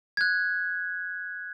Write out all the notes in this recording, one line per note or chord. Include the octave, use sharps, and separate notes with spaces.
F#6 G#6